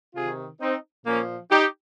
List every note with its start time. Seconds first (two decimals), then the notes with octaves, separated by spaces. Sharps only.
0.15 C3 D#3 F4 G#4
0.61 C4 D#4
1.05 A#2 F3 A#3 C#4
1.51 D#4 G4